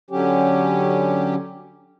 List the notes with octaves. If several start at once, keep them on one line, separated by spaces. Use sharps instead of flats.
D3 F#3 C#4 G4